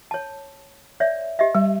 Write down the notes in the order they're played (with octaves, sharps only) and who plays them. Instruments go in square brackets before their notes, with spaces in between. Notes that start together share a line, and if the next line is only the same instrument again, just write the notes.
[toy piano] C#5 A5
C#5 D5 E5
G4 D#5 E5
[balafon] G3